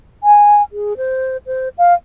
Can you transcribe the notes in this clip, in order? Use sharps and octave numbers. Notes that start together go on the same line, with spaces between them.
G#5
G#4
C5
C5
F5